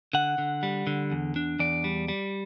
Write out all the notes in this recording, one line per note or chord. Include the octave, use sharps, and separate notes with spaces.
D3 F#5
D3
G3
D3
E2
D4
E2 D5
G3
G3